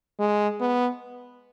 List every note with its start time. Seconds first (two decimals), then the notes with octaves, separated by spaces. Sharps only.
0.19 G#3
0.60 B3